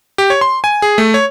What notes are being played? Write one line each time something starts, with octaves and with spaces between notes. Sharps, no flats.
G4
C#5
C6
G#5
G#4
A3
C#5